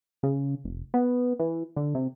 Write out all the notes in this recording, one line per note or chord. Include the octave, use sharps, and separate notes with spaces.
C#3
F1
B3
E3
D3
C3